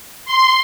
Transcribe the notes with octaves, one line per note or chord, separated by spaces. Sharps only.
C6